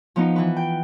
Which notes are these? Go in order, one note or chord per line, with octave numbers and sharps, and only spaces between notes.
F3 B3 D#4
E3 B4
G5